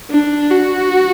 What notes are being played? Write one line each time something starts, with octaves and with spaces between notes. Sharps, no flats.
D4
F#4